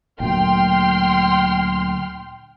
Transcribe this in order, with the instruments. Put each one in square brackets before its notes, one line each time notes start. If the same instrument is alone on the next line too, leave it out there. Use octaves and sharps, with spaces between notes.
[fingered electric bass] D2 A#2 F#3 [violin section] G5 C6 F6